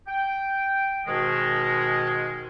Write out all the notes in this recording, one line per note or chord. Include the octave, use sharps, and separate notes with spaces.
G5
G#2 B2 D#3 G#3